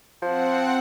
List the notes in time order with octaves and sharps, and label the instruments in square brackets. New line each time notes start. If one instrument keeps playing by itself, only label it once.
[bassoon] F3 [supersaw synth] C4 F#5